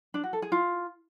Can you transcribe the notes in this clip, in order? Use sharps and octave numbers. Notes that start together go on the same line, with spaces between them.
D4
F#4
A4
G#4
F4